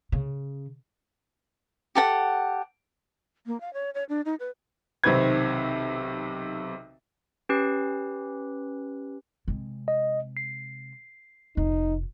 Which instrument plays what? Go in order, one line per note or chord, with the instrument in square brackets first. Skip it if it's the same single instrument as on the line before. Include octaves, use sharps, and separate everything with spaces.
[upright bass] C#3
[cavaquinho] G4 A4 F#5
[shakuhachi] A#3
F5
C#5
C#5
D4
D#4
B4
[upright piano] B1 C3 D#3 C4 B4 G#6
[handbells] C#4 G4 B4
[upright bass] C3 G#3
[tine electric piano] D#5
C7
[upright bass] F1 [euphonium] D#4